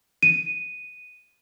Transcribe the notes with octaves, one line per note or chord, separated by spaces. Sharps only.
D#7